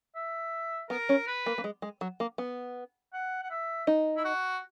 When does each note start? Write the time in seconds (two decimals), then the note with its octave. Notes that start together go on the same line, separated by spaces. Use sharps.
0.15 E5
0.90 B3 A#4
1.09 C#4
1.27 B4
1.46 A#3
1.58 A#3
1.64 G#3
1.82 G#3
2.01 F#3
2.20 A#3
2.38 B3
3.13 F#5
3.43 F#5
3.50 E5
3.87 D#4
4.17 E4
4.25 F#4